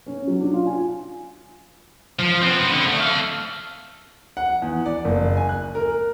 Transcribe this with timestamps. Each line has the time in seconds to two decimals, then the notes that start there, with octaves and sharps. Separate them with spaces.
0.07 C#4
0.27 F#3
0.41 D4
0.53 F4
0.67 G#5
2.19 F3
2.42 B3 C4
2.72 D3
2.87 A3
3.00 A4 F5
4.37 F#5
4.62 E2
4.86 D5
5.05 F#1
5.37 G#5
5.49 F#6
5.75 A#4